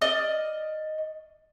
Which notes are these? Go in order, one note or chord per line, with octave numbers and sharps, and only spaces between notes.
D5 D#5 F6